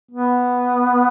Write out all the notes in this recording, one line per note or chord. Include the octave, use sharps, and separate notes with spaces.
B3